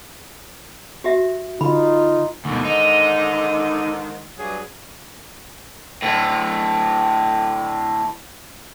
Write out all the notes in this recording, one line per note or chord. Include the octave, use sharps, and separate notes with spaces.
F#4 G4 E5
D3 D#4 F4 B5
D2 G#2 B2 D3 D#3
D#4
G2 F#3 G#4
D2 A2